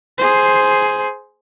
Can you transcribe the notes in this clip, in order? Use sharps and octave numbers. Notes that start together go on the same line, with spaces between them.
G#4 C5